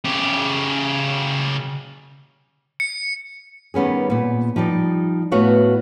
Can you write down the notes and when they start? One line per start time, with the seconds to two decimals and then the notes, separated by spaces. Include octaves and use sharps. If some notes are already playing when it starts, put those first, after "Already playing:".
0.05 C#3 G4
2.80 C#7
3.74 D#3 G3 B3 C#4 G#4
4.10 A#2 B3
4.56 F3 G3 D#4 D5
5.31 A2 B3 F#4 B4 C#5 F5